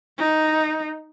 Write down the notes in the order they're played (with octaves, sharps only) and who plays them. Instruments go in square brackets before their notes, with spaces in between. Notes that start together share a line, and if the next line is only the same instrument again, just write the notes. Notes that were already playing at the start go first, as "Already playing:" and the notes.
[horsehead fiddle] D#4